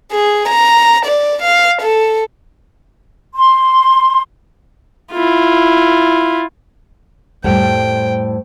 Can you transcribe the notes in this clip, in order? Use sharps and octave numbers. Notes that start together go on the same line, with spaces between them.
G#4
A#5
D5
F5
A4
C6
E4 F4
F2 A2 G3 A3 C5 G5